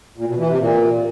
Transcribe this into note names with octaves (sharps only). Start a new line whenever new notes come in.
A#2
B2
E3
C3
A#2